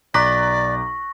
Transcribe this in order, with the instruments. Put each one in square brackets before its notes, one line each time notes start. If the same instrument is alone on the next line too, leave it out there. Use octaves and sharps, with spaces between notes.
[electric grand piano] B1 A#5 [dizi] D5 [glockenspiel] C#6 A#6 [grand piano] D6 F#6 B6